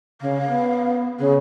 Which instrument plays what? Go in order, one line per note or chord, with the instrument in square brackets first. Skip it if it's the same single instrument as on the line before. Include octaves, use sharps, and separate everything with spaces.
[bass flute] C#3 [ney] F5
[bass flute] B3
[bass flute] C#3 [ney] G#4